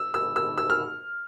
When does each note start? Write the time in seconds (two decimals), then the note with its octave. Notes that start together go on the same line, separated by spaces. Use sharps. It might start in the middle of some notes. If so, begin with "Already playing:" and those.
Already playing: E6
0.14 E6
0.36 E6
0.58 E6
0.70 F6